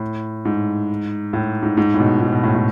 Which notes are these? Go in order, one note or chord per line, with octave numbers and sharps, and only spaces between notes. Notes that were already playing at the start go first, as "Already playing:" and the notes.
Already playing: A2
G#2
A2
G#2
G#2
A2
B2
G#2
B2
A2
A2